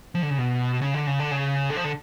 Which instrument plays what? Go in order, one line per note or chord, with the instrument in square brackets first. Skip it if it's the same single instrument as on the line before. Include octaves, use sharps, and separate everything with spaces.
[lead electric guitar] F3
D3
C#3
B2
C#3
D3
C#3
D3
C#3
D3
F3
D3